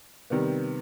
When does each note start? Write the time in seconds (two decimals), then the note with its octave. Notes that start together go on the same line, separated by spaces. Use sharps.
0.30 C3 D#3 G3 B3